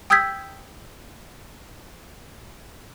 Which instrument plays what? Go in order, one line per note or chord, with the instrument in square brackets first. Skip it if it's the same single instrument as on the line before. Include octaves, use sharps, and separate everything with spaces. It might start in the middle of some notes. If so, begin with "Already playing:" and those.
[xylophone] G5 D#6 E6 G6 G#6 B6